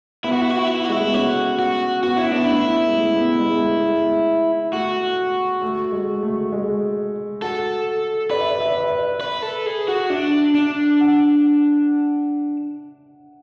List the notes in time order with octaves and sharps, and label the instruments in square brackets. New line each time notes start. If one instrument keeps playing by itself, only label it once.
[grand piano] B3 [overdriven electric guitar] E4
[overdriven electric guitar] F#4
E4
F#4
E4
F#4
E4
F#4
[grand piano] G#3 [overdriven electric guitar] E4
[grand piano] A3
B3
[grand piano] C#4 [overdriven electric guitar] F#4
[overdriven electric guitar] F#4
[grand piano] B3 [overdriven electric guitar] F#4
[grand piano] C#4 [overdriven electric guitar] E4
[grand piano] B3 [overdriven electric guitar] D4
[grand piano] A3 [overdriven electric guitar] E4
[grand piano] G#3
A3
B3
G#3
B3
A3
G#3
[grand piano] A3 [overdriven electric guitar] F#4
[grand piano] A3
G#3
A3
G#3
[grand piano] F#4 [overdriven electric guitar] A4
[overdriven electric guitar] B4 [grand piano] D5
[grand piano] E5
D5
E5
D5
E5
D5
[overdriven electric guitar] B4 [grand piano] E5
[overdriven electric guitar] A4
G#4
F#4
[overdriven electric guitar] D4 [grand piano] E5
[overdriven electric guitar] D4
[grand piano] F#5